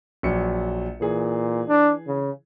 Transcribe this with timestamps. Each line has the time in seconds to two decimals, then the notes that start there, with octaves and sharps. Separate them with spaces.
0.23 A#1 F#3 C#7
1.01 A#2 E3 G#4
1.68 D4
2.07 C#3